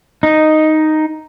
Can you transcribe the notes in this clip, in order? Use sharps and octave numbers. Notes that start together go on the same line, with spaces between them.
D#4